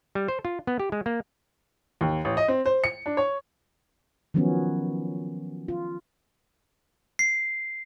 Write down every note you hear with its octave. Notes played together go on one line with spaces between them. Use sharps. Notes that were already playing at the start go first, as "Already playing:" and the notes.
G3
C5
F4
B3
G4
G#3
A#3
D#2
A1
D#5
C4
C5
C#7
D4
C#5
D#3 F3 F#3 B3 C#4
F4
C7